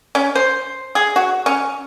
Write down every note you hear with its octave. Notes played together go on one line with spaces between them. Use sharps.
C#4
C5
G#4
F#4
C#4